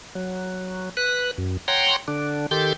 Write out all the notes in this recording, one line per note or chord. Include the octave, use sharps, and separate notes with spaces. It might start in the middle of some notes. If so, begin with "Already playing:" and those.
F#3
B4 F#6
F#2
C#5 F#5 G5 A#5 C6
D3 D4
D#3 G4 A4 C6 D6 G6